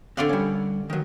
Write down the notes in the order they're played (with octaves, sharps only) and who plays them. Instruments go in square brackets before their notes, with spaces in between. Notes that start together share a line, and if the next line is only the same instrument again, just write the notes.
[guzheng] D3 D5 F#5 [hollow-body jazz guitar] C4 F5 C6
[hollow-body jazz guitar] G3 C#4
D#3 F#3